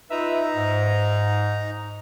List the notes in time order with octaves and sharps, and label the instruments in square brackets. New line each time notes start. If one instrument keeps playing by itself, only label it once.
[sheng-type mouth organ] D#4 A#5 [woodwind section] F4 B4 E5
[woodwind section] G#2